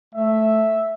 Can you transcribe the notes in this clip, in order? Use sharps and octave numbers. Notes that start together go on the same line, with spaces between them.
A3 E5